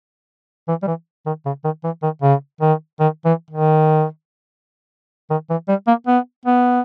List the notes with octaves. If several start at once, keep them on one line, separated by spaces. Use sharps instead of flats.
E3
G3
E3
D#3
C#3
D#3
E3
D#3
C#3
D#3
D#3
E3
D#3
D#3
E3
G3
A#3
B3
B3